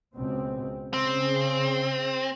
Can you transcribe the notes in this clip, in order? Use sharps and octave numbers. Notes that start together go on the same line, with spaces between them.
C#2 B2 C4
C#3 C4